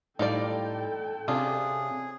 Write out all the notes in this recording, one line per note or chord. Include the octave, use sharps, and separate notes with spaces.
A2 G3 D#4 F4 A4 D5 G5
C3 C#4 D4 F4 G#4